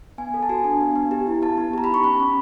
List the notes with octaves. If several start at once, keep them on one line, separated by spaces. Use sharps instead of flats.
B3 G#5
A4
A5
F#4 G#5
D4
B3
B3
G4
E4
B3 A5
B3
G4 A#5
B5
D#4 C#6
C#4 B5
C#4